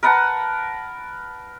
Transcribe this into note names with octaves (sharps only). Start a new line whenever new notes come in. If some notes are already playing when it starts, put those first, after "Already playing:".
A#4 B4 F#5 A5